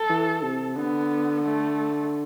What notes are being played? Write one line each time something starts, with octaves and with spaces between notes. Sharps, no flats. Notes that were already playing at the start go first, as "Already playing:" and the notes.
Already playing: A4
E3
C3
D3 B3
A3